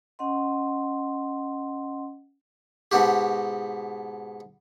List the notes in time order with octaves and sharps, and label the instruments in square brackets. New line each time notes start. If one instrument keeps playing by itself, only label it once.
[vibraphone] C#4 D#5 F#5 C6
[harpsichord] G#2 B2 F#4 G4